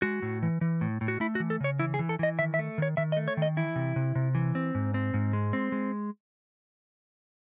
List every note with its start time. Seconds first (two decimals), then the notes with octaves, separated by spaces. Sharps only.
0.02 G#3 F#4
0.22 A2
0.43 E3
0.61 E3
0.81 A2
1.01 A2
1.08 F#4
1.20 A3 E4
1.35 F#4
1.40 E3
1.50 A4
1.61 C#3 C#5
1.79 E3 E4
1.94 G#4
1.99 E3
2.09 A4
2.19 E3 D#5
2.39 D#3 E5
2.54 E5
2.59 A3
2.78 D#3 C#5
2.97 D#3 E5
3.12 D#5
3.17 A3
3.28 C#5
3.37 D#3 D#5
3.57 E3 E4
3.76 C3
3.96 C3
4.15 C3
4.35 E3
4.55 C4
4.75 G#2
4.94 C4
5.14 G#2
5.33 G#3
5.53 C4
5.72 G#3